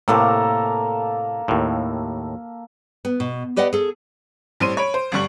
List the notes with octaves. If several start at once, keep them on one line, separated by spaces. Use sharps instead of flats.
A2 C3 A#3 A4 A#4
D#2 A2
B3
B2
G4 B4 D5 D#5 F#5
G#4 A4
A2 G3 C4 C6 D#7
C#5 B5 D7
C5
G1 D3 G3 C#6 F#7